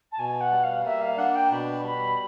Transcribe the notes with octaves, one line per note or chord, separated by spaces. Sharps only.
A5
B2 G#5
F#5
G3
F5
A#3 E5
F5
D4 F#5
G5
B2 B5
G3 B5